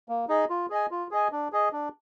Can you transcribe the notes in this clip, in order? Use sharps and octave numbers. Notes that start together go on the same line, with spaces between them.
A#3
D#4 G#4 D#5
F4
G#4 D#5 G#5
F4
G#4 D#5 G#5
D4
G#4 D#5
D4